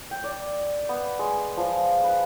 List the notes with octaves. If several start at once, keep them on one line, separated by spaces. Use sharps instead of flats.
G5
D5
B3
G#3
F3
B4